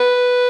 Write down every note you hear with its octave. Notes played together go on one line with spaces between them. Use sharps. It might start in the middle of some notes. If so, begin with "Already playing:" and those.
Already playing: B4